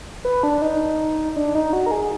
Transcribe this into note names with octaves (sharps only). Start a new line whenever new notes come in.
B4
D4
D#4
D4
D#4
F#4
A#4
G#4